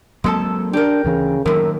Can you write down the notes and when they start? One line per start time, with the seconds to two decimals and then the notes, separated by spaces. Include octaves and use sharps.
0.24 F#3 G#3 A#3 C4 A4 A5
0.73 D4 G4 A#4
1.05 D2 C#3 E3
1.46 F#2 A2 D#3 F#3 A#3 A#4